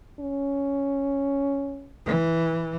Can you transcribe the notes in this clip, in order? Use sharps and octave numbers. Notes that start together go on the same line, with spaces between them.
C#4
E3